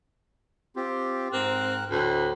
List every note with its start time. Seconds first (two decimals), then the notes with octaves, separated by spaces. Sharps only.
0.76 C4 F4 G4
1.33 G#2 C4 A#4 F#6
1.90 D2 A2